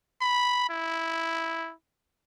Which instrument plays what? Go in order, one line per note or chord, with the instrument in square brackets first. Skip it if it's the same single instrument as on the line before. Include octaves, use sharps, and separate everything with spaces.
[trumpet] B5
E4